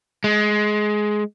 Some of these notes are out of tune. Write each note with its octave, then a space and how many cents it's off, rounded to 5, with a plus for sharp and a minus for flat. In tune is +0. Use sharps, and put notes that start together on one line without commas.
G#3 +15